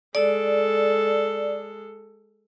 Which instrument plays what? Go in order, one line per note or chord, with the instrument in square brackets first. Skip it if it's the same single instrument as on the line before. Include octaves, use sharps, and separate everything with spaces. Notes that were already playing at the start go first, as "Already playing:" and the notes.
[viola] G#3 A4 [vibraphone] D5